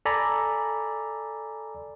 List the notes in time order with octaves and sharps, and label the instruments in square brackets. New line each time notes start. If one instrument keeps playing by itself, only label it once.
[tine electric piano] A4 D5 G#5 A#5 B5